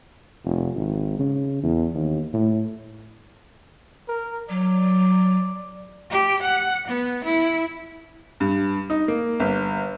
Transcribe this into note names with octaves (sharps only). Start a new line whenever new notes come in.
F1
G#1
C#3
E2
D#2
A2
A#4
F#3 D5
G4
F#5
B3
E4
G2
D#4
A#3
G1